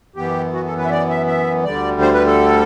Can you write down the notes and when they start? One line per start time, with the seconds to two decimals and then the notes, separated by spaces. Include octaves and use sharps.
0.16 F#2 E3 B3 G4
0.53 F#4
0.65 A4
0.77 B4
0.85 E5
0.90 D5
1.09 E5
1.27 E5
1.64 D2 D3 G3 D5
2.01 C5
2.14 B4
2.26 A4